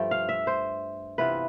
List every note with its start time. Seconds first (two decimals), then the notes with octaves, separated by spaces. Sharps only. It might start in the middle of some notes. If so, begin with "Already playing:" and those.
Already playing: G2 F3 A3 G5
0.11 F5
0.29 E5
0.47 C5
1.18 C3 E3 B3 F4 B4